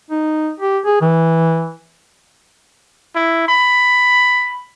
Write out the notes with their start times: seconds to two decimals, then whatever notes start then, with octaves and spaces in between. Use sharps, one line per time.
0.11 D#4
0.60 G4
0.86 G#4
1.01 E3
3.15 E4
3.48 B5